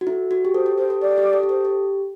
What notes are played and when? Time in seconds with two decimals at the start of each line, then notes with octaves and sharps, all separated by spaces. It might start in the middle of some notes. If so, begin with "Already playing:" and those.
0.01 F#4
0.07 E4 A4
0.31 F#4
0.45 G4
0.54 A4 C5
0.66 G4
0.77 A4 C5
0.90 A4
1.01 G4 D5
1.18 G4
1.33 A4
1.43 G4
1.49 A4 C5
1.65 G4